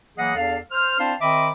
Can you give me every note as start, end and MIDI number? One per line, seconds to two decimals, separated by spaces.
0.17 0.36 52
0.17 0.36 54
0.17 0.36 58
0.17 0.36 68
0.17 0.36 75
0.17 0.36 78
0.36 0.57 40
0.36 0.57 62
0.36 0.57 69
0.36 0.57 77
0.72 0.97 72
0.72 0.97 89
0.99 1.14 60
0.99 1.14 62
0.99 1.14 64
0.99 1.14 72
0.99 1.14 77
0.99 1.14 81
1.21 1.50 51
1.21 1.50 60
1.21 1.50 75
1.21 1.50 76
1.21 1.50 83
1.21 1.50 86